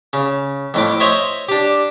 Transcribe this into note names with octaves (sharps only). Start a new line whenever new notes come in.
C#3
F2 A2 D6
C5 C#5 D#5 E5
D4 G4